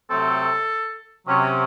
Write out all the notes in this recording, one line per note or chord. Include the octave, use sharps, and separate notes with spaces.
C3 F#3 A3 C4 A4
C3 F#3 C#4 C#5